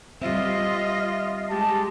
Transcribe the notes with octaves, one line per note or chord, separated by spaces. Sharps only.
G3 C4 F4 D#5 E5
G#3 G4 A5